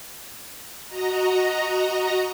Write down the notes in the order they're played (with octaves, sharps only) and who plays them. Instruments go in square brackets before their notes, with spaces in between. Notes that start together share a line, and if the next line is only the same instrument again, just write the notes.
[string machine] F#4 D#5 A#5